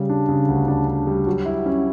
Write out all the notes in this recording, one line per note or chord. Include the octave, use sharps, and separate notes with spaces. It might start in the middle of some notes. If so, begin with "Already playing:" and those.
Already playing: C#3 G3
D4
C#3
D2
D4
D4
G3
F#3
E4
C#4